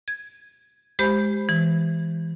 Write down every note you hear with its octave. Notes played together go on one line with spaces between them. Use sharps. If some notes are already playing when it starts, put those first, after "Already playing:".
G#6
G#3 G4 C5 B5 G6
E3